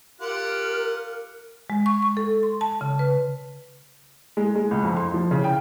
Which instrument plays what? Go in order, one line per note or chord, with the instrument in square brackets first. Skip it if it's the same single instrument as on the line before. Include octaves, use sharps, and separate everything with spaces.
[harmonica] F4 G4 F#5 [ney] A#4
[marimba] G#3
C#6
C#6
A4
C6
A5
C#3
B4
[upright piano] G#3
G#3
C#2
F2
C6
F3
C#3
G5